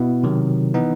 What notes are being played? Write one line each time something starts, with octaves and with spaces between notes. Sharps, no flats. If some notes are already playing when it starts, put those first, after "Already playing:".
Already playing: B2 B3 E4
C3 D#3 F#3
E3 B3 D#4